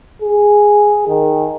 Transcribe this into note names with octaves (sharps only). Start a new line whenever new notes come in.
G#4
D#3